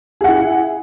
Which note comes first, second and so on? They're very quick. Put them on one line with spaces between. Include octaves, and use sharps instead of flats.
G#4 F#5 E4